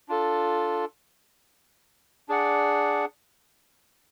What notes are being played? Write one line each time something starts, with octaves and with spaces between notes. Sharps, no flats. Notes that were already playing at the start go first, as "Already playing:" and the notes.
D4 F4 A4
D4 G#4 D5 F#5